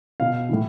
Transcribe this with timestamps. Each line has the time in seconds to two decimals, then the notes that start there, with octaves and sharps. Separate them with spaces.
0.20 B2 F5
0.49 A2 E3